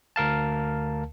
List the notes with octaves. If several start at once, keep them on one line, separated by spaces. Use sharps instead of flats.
D2 A#4 F5 A5